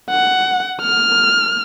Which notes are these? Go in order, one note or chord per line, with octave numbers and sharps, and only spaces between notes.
F#5
F6